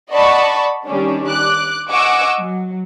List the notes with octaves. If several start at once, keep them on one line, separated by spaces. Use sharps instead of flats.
D5 D#5 F#5 A5 B5 C#6
D#3 G3 C#4 D4
D6 F#6
D#5 F#5 G#5 C#6 D6 E6
F#3